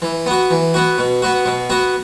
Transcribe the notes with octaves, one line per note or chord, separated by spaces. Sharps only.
E3
B3 F#4
E3
B3 F#4
B2
B3 F#4
B2
B3 F#4